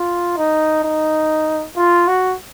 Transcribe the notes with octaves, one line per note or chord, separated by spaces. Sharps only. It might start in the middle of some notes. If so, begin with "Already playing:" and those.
Already playing: F4
D#4
D#4
F4
F#4